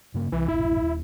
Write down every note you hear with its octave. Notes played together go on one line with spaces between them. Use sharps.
G2 C#3 A#3
C2 E3
E1 A#1 E4
D#1